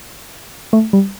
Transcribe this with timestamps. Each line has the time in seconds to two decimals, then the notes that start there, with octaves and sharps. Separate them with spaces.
0.73 A3
0.93 G3